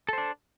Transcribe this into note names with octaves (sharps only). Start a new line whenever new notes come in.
D4 A4 C5